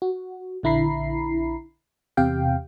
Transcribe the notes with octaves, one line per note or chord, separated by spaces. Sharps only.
F#4
A#1 D3 E4 A#5 B5 C7
E2 C3 G4 F5 G5